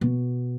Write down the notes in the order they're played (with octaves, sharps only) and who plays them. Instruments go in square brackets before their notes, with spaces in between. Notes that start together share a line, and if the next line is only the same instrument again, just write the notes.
[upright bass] B2